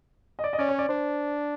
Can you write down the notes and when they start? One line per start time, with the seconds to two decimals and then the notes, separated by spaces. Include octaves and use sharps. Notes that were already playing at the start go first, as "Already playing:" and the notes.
0.39 D#5
0.44 D5
0.53 D#5
0.58 C#4 D5
0.69 C#5
0.79 D5
0.89 D4 C5